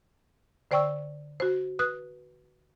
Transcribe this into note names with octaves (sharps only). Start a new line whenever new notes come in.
D3 C5 D5 G5 C#6 E6
F#4 C5
B4 D#6 F#6